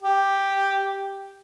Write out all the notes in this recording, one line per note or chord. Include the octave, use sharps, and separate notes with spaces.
G4